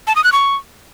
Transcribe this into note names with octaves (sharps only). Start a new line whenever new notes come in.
A5
D#6
F#6
C#6